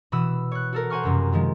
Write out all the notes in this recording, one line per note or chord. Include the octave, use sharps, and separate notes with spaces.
B2 E3 B5 D#6 E6
C#5 F#6
F#4 A4 A#4
C5 F#5 G#5 C6 C#6 F6
F1 F#2 C3
D#3 F3 G#3